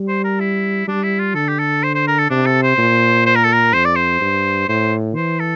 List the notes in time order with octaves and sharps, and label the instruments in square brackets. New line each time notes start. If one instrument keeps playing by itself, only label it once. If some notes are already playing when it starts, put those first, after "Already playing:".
Already playing: [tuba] G3
[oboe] C5
A#4
E4
[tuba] G3 [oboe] D4
[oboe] E4
F4
[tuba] D3 [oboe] A4
[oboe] G4
A4
C5
C5
A#4
A4
[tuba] C3 [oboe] D4
[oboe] A4
C5
[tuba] A#2
[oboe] C5
A#4
A4
A#4
[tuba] F2 [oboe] C5
[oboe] D5
C5
[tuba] G2
[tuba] A2 [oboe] C5
[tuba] E3 [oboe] C5
[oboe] A4